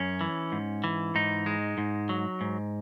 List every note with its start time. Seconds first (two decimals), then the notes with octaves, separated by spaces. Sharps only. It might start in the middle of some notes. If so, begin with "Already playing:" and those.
Already playing: F#2 C#4
0.21 E3
0.52 G#2
0.84 E3
1.15 G#2 D#4
1.46 G#3
1.78 G#2
2.09 F#3
2.41 G#2